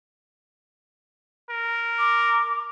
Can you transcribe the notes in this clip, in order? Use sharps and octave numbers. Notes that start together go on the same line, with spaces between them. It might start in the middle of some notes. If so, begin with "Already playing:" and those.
A#4
D6